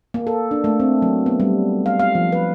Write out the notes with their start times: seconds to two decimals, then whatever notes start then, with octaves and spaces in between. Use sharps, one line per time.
0.14 A#3
0.27 A4
0.51 D4
0.64 A3
0.80 C4
1.02 F#3
1.26 B3
1.40 G3
1.86 F5
2.00 F5
2.15 F3
2.32 B4